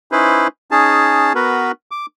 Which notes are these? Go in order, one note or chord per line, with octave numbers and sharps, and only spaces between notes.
C#4 D#4 E4 B4 C5
C#4 D#4 G#4 A5
B3 F#4 A#4 B4
D6